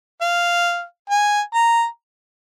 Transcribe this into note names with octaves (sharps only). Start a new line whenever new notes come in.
F5
G#5
A#5